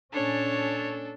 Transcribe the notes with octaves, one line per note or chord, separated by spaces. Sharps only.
A#2 C#4 D4 A4 C#5